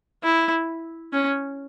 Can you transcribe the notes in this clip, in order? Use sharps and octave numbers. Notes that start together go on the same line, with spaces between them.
E4
C#4